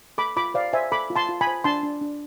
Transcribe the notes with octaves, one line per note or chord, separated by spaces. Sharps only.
A4 B5 D6
F4 B5 D6
C5 D5 F5
C5 E5 G#5
A4 B5 D6
F4
A5 C6
F4
G#5 B5
C5
D4 A5 C6
D4
D4